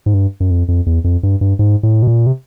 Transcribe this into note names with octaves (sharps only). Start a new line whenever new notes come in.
G#2
G2
F#2
F2
F2
E2
F2
G2
G2
G#2
A2
B2
A#2
C3